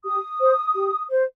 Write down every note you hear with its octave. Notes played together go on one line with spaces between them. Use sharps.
G4 D#6
C5
G4
C5